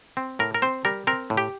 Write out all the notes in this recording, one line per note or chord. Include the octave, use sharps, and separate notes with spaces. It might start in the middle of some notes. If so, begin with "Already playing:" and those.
C4
A2 A#4
A#4
C4 C5
G3 A#4
C4 A#4
A2
G4